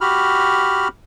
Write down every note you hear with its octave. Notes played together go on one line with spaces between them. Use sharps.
F#4 G4 B5 F6